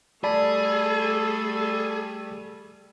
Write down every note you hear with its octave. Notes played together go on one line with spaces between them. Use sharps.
G3 A3 G#4 A4 D5 A5 B5